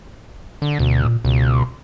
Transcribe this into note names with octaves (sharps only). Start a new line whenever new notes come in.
D3
D2 B2
A#2
C#2 B2